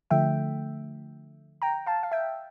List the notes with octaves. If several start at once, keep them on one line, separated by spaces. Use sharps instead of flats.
D3 F3 A3 E5 G5
G5 A#5
F5 A5
F5
E5 G5